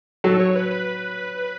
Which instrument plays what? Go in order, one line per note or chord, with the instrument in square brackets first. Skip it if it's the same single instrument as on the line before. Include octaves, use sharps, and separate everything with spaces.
[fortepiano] F#3 [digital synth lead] A4
[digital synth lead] C#5
B4
B4